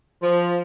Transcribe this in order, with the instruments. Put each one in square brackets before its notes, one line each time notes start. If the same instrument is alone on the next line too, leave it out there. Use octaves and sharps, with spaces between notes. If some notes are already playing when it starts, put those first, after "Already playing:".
[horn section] F3